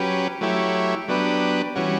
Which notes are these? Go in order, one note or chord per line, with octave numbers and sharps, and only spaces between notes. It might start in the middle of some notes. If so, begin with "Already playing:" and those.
Already playing: F#3 C#4 G4 B4
F#3 A3 E4 G4 C#5
F#3 B3 D4 G4 B4
E3 G3 C#4 F#4